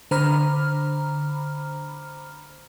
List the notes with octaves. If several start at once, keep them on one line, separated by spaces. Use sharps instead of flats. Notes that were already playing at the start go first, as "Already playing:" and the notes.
D3 C5 A#5 B5 F6